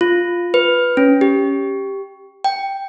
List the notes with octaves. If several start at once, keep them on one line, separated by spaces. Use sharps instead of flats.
F4
B4
C#4
G4
G5